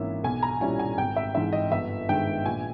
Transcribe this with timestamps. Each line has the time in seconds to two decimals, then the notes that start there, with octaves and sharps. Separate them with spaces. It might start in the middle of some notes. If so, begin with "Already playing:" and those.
Already playing: G#1 E3 A#3 C#4 E5
0.24 B1 G#5
0.43 A#5
0.61 A#2 G3 C#4 E4 G#5
0.79 G#5
0.98 G#1 G5
1.16 E5
1.35 G#2 E3 E5
1.53 D#5
1.71 G1 E5
2.09 G2 D#3 G#3 G5
2.45 A#1 G#5